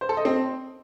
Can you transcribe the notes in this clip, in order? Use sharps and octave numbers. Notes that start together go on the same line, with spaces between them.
C5
A4
D#5
C4